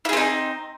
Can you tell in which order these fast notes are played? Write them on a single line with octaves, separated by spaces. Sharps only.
E4 G#4 C4 D#4